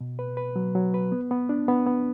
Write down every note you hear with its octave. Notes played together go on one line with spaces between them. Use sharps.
B2
B4
B4
F#3
F#3
B4
B3
B3
D4
B3
B3